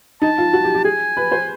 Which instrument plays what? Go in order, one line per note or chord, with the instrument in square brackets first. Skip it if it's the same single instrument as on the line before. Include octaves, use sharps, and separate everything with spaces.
[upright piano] D#4 [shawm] A5
[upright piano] F4
F#4
G4
G4
[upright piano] G#4 [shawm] G#5
[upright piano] B4
C5